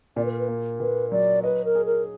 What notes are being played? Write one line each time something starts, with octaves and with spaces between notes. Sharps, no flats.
A#2 D5
B4
A#4
B4
A#3
A#2 B4
F#3 D5
B4 D#5
A#4
G#4
A#4